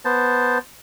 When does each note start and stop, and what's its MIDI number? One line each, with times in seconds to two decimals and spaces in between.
0.05 0.58 59
0.05 0.58 72
0.05 0.58 81